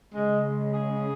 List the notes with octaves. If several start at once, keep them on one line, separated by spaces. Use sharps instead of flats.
C#3 G#3
G#3
G#4